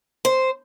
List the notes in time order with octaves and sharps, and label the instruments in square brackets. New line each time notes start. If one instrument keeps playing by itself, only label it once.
[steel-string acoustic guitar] C5